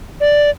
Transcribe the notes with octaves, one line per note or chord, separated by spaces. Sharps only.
D5